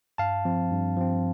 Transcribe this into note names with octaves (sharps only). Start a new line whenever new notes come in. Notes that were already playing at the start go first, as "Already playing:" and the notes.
G2 F5 A5
F3 C4
G2
F3 C4